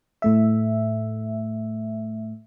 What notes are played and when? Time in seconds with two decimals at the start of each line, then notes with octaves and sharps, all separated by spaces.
0.22 A2 A3 E5